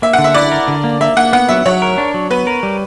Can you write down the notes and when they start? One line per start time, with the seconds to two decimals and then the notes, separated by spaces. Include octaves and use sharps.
0.02 A#3 E5
0.13 F#5
0.18 D3
0.24 E5
0.34 E4 D5
0.52 A#4
0.68 D3
0.84 A#3
1.01 A#3 E5
1.17 A#3 F#5
1.33 B3 F#5
1.49 F#3 E5
1.66 F#3 C#5
1.82 A#4
1.98 D4
2.14 F#3
2.30 B3 B4
2.47 A#4
2.63 G3